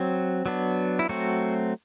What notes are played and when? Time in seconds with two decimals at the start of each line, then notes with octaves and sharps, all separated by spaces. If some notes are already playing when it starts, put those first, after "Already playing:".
Already playing: F#3 C4
0.46 F#3 B3 D4
0.99 E4
1.09 F#3 A3 C4 F#4